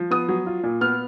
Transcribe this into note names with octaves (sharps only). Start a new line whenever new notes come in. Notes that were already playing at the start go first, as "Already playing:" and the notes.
Already playing: F3
B3 D#6
F#3
F4
A#2
B3 F6